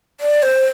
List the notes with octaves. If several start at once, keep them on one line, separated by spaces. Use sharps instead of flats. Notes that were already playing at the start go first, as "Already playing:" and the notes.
D5
C5